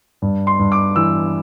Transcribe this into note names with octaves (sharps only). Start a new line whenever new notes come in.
G2
C6
G2
D6
E3 E6